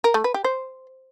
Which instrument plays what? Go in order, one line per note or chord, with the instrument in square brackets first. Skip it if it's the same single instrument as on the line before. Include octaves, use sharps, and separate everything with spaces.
[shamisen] A#4
A3
B4
G4
C5